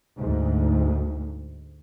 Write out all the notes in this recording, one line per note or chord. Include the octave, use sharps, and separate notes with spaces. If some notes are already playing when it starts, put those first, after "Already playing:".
D2 G#2